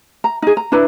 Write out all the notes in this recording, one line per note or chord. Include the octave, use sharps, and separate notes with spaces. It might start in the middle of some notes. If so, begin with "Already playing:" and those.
A#5
D#4 G#4
A#5
D4 E4 B4 A#5